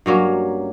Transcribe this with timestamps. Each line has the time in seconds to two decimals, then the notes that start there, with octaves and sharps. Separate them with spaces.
0.06 G2 F#3 A#3 C#4